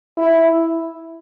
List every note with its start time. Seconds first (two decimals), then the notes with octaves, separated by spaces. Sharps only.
0.17 E4